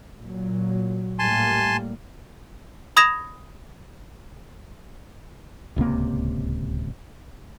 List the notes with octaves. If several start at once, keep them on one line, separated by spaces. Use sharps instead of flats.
A#2 F#3
A2 G3 A#3 G#5 A5 C6
B5 D#6 G#6 A#6 E7 F7
D1 C#2 C3 A#3